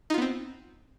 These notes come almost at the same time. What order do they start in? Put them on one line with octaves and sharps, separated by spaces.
D#4 F4 B3 C4